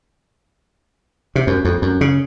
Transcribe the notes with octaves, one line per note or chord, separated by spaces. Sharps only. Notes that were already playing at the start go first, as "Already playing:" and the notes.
C3
F#2
F2
F#2
C#3